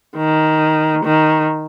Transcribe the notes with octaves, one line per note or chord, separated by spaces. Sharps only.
D#3
D#3